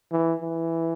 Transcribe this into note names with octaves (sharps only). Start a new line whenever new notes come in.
E3
E3